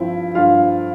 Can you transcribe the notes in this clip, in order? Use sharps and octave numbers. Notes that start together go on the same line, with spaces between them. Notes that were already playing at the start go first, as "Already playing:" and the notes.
Already playing: G2 F3 C4 E4
G2 F4 F5